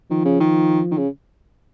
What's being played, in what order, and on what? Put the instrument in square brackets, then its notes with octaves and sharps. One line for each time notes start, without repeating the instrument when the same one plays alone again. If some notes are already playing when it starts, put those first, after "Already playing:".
[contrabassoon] D#3 [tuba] F3
[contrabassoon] C#3
D#3
D#3
C#3